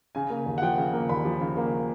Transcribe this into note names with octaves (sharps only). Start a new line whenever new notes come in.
C#3 G#5
A#3
D#2
F#5
F3 G5
C#3
A#3
D#2 B5
F3
C#3
A#3